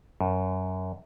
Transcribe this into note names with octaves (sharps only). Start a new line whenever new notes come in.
F#2